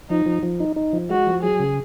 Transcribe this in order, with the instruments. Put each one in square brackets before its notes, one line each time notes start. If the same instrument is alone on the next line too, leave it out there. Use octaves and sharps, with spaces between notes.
[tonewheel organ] F3 [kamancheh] D#4
[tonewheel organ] F3
F3
D#4
D#4
F3
[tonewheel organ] G#3 [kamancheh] F#4
[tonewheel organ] F3
[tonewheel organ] F#3 [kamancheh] G#4
[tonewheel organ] C#3